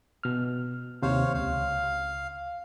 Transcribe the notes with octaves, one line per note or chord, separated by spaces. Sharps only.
B2 F6
D#2 C3 C5 C#5 F5
C#2 F5